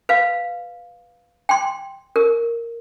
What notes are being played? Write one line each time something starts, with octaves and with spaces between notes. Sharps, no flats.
B4 F5
G5 C6
A#4